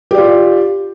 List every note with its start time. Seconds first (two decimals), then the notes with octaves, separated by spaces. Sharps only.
0.11 G4
0.14 D5
0.18 F4